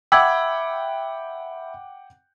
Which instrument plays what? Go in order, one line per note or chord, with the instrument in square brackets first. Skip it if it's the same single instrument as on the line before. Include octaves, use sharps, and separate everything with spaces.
[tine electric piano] E5 B5 [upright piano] F#5 G5 D6 [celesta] E6 G#6